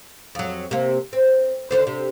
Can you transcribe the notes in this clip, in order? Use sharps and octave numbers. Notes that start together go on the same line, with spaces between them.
F2 F#3
C3 A#3
C4
D#2 D3 C5
C3